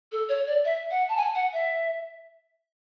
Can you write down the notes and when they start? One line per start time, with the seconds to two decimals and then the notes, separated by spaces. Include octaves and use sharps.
0.12 A4
0.29 C#5
0.47 D5
0.65 E5
0.90 F#5
1.09 A5
1.17 G#5
1.35 F#5
1.53 E5